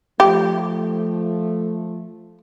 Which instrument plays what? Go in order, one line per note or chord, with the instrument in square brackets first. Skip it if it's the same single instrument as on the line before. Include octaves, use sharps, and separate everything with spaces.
[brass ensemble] F3 A3 [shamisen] G4